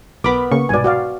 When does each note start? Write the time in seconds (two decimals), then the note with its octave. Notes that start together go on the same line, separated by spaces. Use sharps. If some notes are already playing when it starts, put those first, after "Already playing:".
0.24 B1 B3 A#4 B5 D6
0.51 C#3 A#3 C#6
0.69 C2 G#2 B2 D5 G#5
0.84 F#4 D5 F5